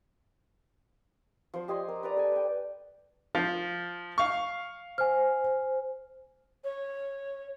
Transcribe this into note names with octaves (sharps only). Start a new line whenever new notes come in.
F3 C5
G4 D#5 G#5 C6
A#4
B4 D5 A#5
A4 G#5
B4 G5
F3
F5 C#6
C5 G#5 F6
C#5